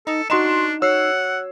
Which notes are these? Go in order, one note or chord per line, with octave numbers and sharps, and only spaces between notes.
D#4 A4
D4 D#4 F#4 C6 E7
F#4 C#5 F#5 E6 C7